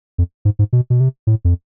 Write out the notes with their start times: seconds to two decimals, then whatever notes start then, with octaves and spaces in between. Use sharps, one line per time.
0.18 F2
0.45 G#2
0.59 G#2
0.73 B2
0.90 B2
1.00 C3
1.27 A2
1.45 F2